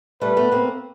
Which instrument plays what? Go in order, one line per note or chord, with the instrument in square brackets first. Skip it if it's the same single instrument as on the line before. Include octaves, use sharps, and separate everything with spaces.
[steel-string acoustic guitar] G3 A3 [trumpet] B4
[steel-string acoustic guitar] A3 B3
A#3 C4